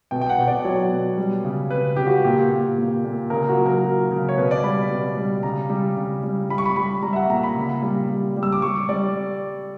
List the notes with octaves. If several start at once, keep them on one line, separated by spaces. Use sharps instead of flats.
B2 G5
G5
F#5
B2
D5
F#3 C#5
B2
G3
C#3
C#3 B4
C#3 G4
F#4
A#2 G4
A#2
A#2
A#2
C#3 A#4
F#4
F#3
A#4
F#3
C#3
C#5
B2 B4
D5
G3 B5
B2
G3
C#3 A#5
G3
C#3
G3
G3 B5
C#6
B5
G3 B5
G3 A#5
E5
F#5
A#2 A#5
B5
C#3
G3
G3
G3
E6
D6
G3 C#6
G3 D5